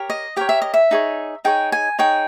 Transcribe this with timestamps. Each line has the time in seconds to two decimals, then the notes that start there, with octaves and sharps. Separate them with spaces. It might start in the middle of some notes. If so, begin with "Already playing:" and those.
Already playing: G4 A#4 C#5
0.10 D#5
0.37 G4 A#4 C#5 G5
0.49 E5
0.62 D#5
0.74 E5
0.91 D#4 G#4 C#5
1.45 D#4 G#4 C#5 G5
1.72 G#5
1.99 D#4 G#4 C#5 G5